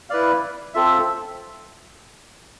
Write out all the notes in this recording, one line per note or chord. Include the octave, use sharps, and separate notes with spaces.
E4 B4 D5 F5
C4 F4 A4 E5